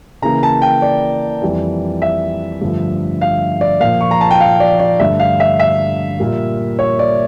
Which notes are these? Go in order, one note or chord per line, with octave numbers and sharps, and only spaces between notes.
C#3 E3 A#3 A#5
A5
G5
D5
F2 E3 G3
E5
G2 D3 F3 A3
F5
D5
A#2 F3 A#3 F5
C#6
A#5
A5
G5
F5
D5
D5
G2 D3 A3 E5
F5
E5
E5
A#2 G3 A#3
C#5
D5